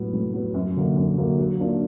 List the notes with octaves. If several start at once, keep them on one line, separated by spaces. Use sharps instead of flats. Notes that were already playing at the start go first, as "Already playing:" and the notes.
Already playing: A2 F#3 B3
A2
F#3 B3
F#2
D3 F#3 A#3
F#2
D3 F#3 A#3
F#3
A#3 D4 F4